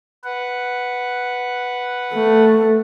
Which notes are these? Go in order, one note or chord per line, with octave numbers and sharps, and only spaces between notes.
B4 F#5
A3